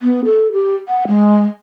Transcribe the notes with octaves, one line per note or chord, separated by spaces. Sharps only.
B3
A4
G4
F#5
G#3